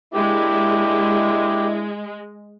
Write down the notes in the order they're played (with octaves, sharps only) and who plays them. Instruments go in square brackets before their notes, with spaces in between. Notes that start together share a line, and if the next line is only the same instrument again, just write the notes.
[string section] G#3 [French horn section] A#3 D4 E4 [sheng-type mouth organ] G4